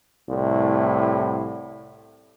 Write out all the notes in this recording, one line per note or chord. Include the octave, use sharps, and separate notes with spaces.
C2 A2